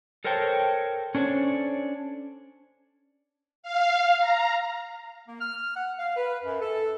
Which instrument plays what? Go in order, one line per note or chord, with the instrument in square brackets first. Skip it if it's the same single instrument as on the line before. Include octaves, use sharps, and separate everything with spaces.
[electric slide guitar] A4 A#4 C5 C#5 G5 A5
C#4 D4 A4 C5 C#5
[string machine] F5
A#5
[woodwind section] A#3
F6
F#5
F5
B4
F#2
A4